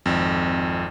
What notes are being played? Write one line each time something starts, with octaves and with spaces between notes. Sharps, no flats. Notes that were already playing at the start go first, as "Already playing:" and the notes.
G#1 F2